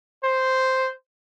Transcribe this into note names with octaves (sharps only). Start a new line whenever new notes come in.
C5